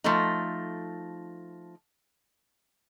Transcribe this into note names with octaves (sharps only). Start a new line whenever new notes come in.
F3 A3 D#4